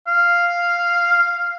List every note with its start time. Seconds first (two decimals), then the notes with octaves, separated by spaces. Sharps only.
0.08 F5